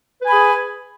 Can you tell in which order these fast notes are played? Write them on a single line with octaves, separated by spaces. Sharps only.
B4 G#5 B5 G#4